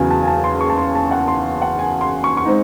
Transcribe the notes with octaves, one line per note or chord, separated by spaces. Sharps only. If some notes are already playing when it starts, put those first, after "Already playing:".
Already playing: E2 C#3 F#3 G#5
A5
G#5
A5
C6
C#6
A5
C6
A5
F#5
C6
F#5
G#5
C6
C#6
C#6
G#3 C4 D#4